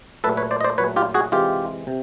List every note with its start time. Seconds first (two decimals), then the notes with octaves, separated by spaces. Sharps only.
0.24 A#2 F#3 A3 A4 B4
0.37 B4 C#5
0.51 C5 D5
0.61 D#5
0.64 C5 D5
0.78 A#2 F#3 A3 B4 C#5
0.96 F4 G4
1.14 F#4 G#4
1.32 C3 E3 G#3 F4 G4
1.87 C3